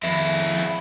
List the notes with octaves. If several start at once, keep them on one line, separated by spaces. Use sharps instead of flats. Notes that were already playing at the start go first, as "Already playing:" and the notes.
F2 E4